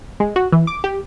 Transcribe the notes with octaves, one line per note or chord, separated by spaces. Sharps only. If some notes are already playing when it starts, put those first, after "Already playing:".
G#3
F#4
E3
D6
G4